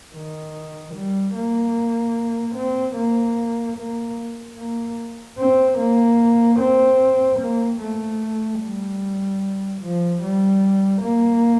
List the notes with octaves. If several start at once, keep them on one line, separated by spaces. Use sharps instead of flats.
D#3
G3
A#3
C4
A#3
A#3
A#3
C4
A#3
C4
A#3
A3
G3
F3
G3
A#3